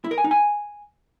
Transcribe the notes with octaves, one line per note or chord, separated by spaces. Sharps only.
E4
A#4
G#5
D#4
G#5